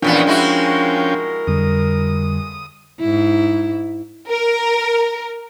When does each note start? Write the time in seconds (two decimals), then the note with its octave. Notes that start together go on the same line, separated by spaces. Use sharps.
0.02 E2 A#2 F3 B3 C#4 D4 A#4 G5
0.27 G#3 E4 F#4
1.47 F2 D3 G3 D#6
3.00 G#2 E4
4.30 A#4